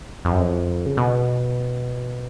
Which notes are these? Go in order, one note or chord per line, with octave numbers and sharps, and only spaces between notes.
F2
F#2
F2
C#3
B2